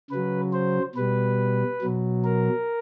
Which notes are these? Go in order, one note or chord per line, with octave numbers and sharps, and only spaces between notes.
C#3 F#3 B4
C5
B2 G3 B4
B2 F#3
A#4